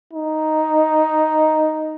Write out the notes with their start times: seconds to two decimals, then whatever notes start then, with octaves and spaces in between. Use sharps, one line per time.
0.13 D#4